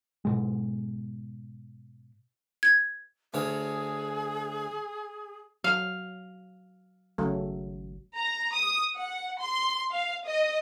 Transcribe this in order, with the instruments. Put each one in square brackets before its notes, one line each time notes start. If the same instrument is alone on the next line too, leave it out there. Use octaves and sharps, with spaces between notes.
[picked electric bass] G#2 B2 G#3
[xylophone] G#6
[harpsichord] D2 C#5 [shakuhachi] G#4
[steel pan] F#3 [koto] F5
[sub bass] G#1 [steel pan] C#3 F#3 A3
[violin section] A#5
D#6
F#5
C6
F5
D#5